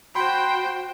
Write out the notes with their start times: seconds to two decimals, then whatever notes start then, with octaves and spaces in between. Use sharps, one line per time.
0.15 F#4 C5 G5 B5 C6 G6